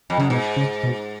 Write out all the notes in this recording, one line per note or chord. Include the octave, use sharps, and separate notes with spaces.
F2
F#2 C#3
G#2 B2
C#3
B2